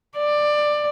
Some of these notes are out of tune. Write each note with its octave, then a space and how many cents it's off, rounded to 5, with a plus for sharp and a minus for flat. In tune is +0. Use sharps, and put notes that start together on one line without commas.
D5 +15